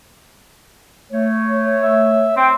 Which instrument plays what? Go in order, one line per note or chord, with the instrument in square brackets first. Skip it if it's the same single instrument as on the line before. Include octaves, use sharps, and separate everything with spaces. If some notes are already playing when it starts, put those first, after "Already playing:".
[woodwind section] A3 C#5
[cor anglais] E5
[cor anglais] C4 [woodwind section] G5